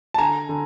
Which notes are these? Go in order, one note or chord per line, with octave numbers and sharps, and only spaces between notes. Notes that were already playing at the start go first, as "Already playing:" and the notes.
A5
D3 G#5 A#5
D3